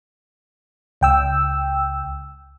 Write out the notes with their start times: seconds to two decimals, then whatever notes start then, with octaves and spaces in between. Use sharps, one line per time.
1.01 C#2 G5 E6